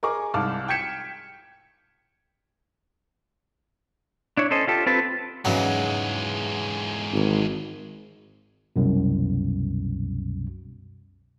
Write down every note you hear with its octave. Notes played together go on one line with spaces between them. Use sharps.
G#4 A#4 D#5 G#5 C#6 D6
C2 G#2 F5 A5 D6 F6
G5 G6 G#6 B6 C#7 E7
D4 E4 C#5
C#4 A4 C5 D#5
F4 G4 A4
C4 F4 A4 B4 A5
E2 G#2 C#3 E3 F#3 G#3
G#1
C2 F#2 B2